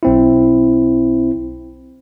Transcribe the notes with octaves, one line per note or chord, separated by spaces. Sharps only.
B1 C4 E4